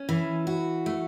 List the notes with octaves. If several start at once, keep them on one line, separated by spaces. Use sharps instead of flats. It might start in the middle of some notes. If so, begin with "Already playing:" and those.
Already playing: C#4
E3
F#4
A3